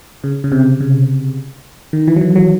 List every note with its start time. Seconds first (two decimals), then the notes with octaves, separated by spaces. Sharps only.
0.24 C#3
0.44 C#3
0.52 C3
0.81 C#3
1.93 D#3
2.08 E3
2.16 F#3
2.21 E3
2.36 F#3